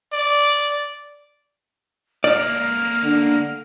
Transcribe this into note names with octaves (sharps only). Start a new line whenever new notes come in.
D5
A3 A#3 D5 F6
D3